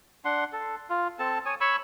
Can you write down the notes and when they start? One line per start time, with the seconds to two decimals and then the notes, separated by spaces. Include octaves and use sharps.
0.25 D4 F#5 C6
0.53 A4
0.90 F4
1.19 C4 A4 A5
1.46 C#5 G#5 D#6
1.61 C#5 B5 C#6 E6